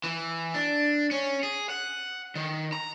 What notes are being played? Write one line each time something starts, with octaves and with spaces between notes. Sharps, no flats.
E3
D4
C#4
G#4
F#5
D#3
A#5